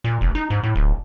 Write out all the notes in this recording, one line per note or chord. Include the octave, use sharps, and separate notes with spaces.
A#2
F1
D#4
G#2
A2
D1